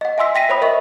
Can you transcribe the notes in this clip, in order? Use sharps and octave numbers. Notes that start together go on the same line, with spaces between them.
D#5 F#5
E5 G#5 C6 E6 B6
G5 A#6 B6 D#7
C5 C#5 B5 D#6
A#4 D#5 E5 C#6